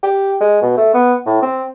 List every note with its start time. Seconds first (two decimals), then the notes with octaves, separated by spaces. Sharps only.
0.03 G4
0.40 G#3
0.62 B2
0.77 A3
0.94 B3
1.26 A2
1.42 C4